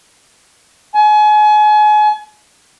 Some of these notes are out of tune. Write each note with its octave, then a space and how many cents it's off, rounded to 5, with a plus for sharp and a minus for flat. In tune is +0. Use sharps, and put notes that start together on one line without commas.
G#5 +35